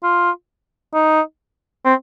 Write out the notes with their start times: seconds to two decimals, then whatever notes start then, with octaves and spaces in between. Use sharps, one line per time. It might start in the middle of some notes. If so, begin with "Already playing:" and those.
0.03 F4
0.94 D#4
1.85 C4